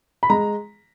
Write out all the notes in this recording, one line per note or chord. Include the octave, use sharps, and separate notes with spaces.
B5
G#3 A#5